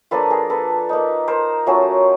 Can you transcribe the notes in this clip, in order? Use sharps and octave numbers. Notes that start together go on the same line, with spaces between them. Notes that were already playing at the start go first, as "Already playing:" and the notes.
F3 A#3 D4 F4 A4 B4
G#4 A#4
A4 B4
A#3 D#4
A#4 C5
F#3 A3 C#4 F4